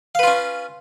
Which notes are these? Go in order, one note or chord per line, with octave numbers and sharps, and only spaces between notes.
C#4 F4 B4 F5